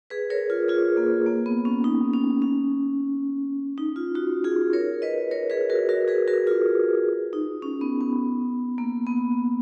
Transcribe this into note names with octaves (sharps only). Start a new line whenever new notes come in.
G#4 B4
A#4 C#5
F4
F4 G#4
A#3
A#3
B3
C#4
D#4
C#4
C#4
D#4
F4
D#4 F#4
F4 G#4
A#4 C#5
B4 D#5
A#4 C#5
G#4 B4
F#4 A#4
F#4 A#4
G#4 B4
F#4 A#4
F4 G#4
D#4
C#4
B3
B3
A#3
B3